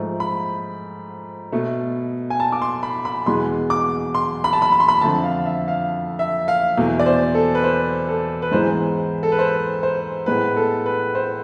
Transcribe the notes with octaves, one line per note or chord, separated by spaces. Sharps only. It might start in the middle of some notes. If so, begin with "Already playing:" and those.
Already playing: G#2 F3 A3
B5
B2 A3
G#5
A5
D6
C6
B5
B5
E2 B2 G#3 B3 C6
D6
C6
B5
A5
B5
B5
C6
B5
F2 D3 A3 A5
F5
E5
F5
E5
F5
E2 B2 A3
D5
C5
A4
B4
C5
A4
B4
G#2 E3 G#3 B3 C5
A4
B4
C5
C5
A2 G#3 B3 B4
A4
B4
C5